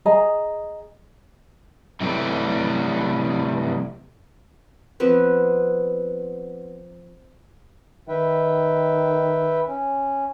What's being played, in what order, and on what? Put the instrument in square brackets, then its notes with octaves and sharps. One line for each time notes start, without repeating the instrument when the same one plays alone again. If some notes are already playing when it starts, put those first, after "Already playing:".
[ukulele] G#4 D#5 G#5 A#5
[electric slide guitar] C3 E3 F#3 G3 A3
[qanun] F3 B3 C4 B4
[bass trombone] D#3 [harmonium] B4 E5 G5
[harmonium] C#4